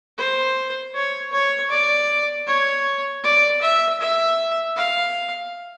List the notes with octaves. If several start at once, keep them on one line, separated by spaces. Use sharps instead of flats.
C5
C#5
C#5
D5
C#5
D5
E5
E5
F5